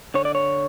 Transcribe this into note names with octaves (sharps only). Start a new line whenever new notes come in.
D3 C#5
D5
C#5